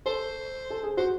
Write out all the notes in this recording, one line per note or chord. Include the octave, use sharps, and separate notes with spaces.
A4 C5
A4
G#4
F#4 C5